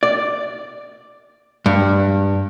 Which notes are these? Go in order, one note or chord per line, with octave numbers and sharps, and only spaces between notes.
D5
G2